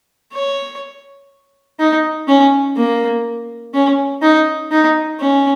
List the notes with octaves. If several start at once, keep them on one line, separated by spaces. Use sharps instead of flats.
C#5
D#4
C#4
A#3
C#4
D#4
D#4
C#4